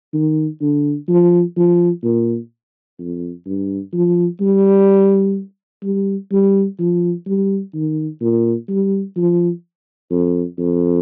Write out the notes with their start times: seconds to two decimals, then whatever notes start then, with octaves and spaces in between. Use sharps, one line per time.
0.13 D#3
0.61 D3
1.09 F3
1.57 F3
2.03 A#2
2.98 F2
3.46 G2
3.93 F3
4.41 G3
5.83 G3
6.32 G3
6.79 F3
7.27 G3
7.74 D#3
8.21 A#2
8.69 G3
9.16 F3
10.11 F2
10.58 F2